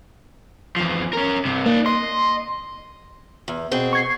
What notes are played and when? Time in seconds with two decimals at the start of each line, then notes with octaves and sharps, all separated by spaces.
0.76 E2 F3
1.13 C#4 A#4
1.45 G2 C3
1.66 A#3 D#4 D5
1.86 D#5 C6
3.48 E2
3.71 B2 C4 G#4
3.93 C#6 G#6 C7